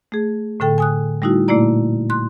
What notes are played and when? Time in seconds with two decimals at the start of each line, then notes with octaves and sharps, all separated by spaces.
0.12 A3 G#4
0.60 A2 D3 A4 G5
0.78 G#5 D#6 F#6
1.22 G3 A3 D#4 E4 F#4
1.48 A#2 A3 A#3 E4 D5 A#5
2.10 C6 F#6